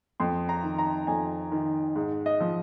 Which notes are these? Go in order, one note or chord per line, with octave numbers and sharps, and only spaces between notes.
F2 C6
A#5
D#3
A#5
F2 G#5
D#3
G#2
D#5
F3